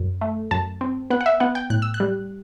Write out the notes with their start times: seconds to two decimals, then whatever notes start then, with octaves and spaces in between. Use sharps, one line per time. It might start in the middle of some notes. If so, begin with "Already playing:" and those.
Already playing: F#2
0.21 A3
0.51 F#2 A5
0.81 C4
1.10 B3 F#5
1.21 F#5
1.26 E5
1.40 B3 F#5
1.55 G5
1.70 A2 F#6
1.82 E6
1.94 F#6
2.00 G3